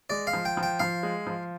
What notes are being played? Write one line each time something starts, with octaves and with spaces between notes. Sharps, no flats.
G#3 D5
F5
F3
G5
F3
G5
F3 F5
G#3
F3